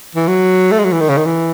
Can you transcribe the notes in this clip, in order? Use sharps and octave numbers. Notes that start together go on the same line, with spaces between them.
E3
F#3
A3
G#3
F#3
E3
D#3
C#3
D#3
E3